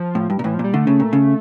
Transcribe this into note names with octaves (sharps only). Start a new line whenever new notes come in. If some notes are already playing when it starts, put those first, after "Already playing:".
Already playing: F3
A2
G2
A#2
A2 E3
F3
A#2 G3
D3 A3
C#3
A#2
C#3